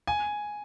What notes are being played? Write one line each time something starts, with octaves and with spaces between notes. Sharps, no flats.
G#5